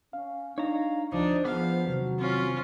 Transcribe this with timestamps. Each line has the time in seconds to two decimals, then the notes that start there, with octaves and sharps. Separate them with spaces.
0.13 C#4 F5
0.58 D4 D#4 C#5 F5 A#5
1.12 D2 F3 D4 D#4 C5
1.45 F3 B3 G#4 F5
1.87 E2 C3 D#3 F#3
2.18 C4 C#4 F4